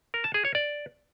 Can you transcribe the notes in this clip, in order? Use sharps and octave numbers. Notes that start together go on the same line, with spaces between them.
A#4
A5
G#4
C#5
D5